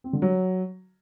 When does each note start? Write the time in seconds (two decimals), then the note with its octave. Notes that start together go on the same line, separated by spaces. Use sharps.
0.04 C4
0.13 D3
0.22 F#3